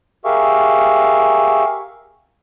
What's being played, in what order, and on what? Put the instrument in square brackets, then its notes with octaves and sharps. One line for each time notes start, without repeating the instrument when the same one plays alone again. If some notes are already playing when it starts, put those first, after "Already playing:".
[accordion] G4 G#4 A#4 E5 F5 C#6